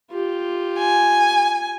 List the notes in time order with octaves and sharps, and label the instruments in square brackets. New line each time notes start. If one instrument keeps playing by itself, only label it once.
[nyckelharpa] F4 G4
[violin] G#5